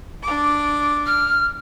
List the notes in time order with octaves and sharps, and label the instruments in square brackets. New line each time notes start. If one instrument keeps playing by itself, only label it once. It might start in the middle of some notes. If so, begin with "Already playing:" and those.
[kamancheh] D4 D6
[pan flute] F6